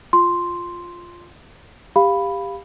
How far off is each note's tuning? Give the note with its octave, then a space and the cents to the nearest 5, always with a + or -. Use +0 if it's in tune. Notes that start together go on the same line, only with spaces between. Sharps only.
F4 +0 C6 +0
G4 +15 F5 +0 B5 +0